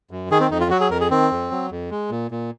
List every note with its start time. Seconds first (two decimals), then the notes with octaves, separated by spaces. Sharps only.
0.11 F#2
0.31 D#3 G#4
0.40 C4
0.51 F2 D#4
0.61 F4
0.71 F#3 F#4
0.81 G#4
0.90 F2 A#4
1.01 G#4
1.11 D#3 C4
1.31 F2
1.51 F#3
1.71 F2
1.91 G#3
2.10 A#2
2.31 A#2